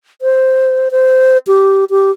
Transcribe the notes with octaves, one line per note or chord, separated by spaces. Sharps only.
C5
C5
G4
G4